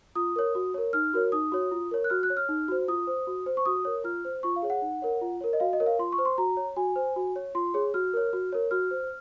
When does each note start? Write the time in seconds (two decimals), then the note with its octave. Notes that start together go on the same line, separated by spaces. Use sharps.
0.15 F4 D#6
0.36 A#4 C#5
0.55 F#4
0.74 A#4 C#5
0.93 D#4 F6
1.13 F#4 A#4 C#5
1.32 D#4 D#6
1.52 F#4 C#5
1.71 F4
1.91 A#4 C#5
2.04 F#6
2.10 F#4 F6
2.23 F#6
2.30 C#5
2.37 F6
2.49 D#4
2.68 F#4 C5
2.88 F4 D#6
3.07 C5
3.27 F#4
3.46 C5
3.57 C#6
3.66 F#4 D#6
3.85 A#4 C#5
4.04 F4 F6
4.25 C5
4.43 F4 C#6
4.56 F5
4.62 G#4 C#5
4.70 F#5
4.82 D#4
5.02 A#4 C#5
5.21 F4
5.41 A#4 C#5
5.53 D#5
5.60 F#4 F5
5.73 D#5
5.80 A#4 C#5
5.86 F5
5.99 F4 C6
6.12 C#6
6.18 C5
6.25 C6
6.38 F#4 A#5
6.57 C#5
6.76 F#4 G#5
6.96 C5
7.16 F#4
7.36 C#5
7.55 F4 C6
7.74 G#4 C#5
7.94 F#4 F6
8.13 A#4 C#5
8.33 F#4
8.52 A#4 C#5
8.71 F#4 F6
8.91 C5